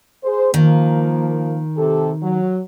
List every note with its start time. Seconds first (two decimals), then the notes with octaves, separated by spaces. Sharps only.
0.24 G#4 C5
0.54 D#3 F3 A#3
1.77 C3 G4 A4
2.23 F#3